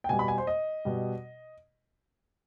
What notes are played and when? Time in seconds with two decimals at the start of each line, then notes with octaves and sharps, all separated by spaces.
0.04 G5
0.09 B2 G3 G#5
0.19 B5
0.28 G#5
0.38 C5
0.47 D#5
0.85 B2 G3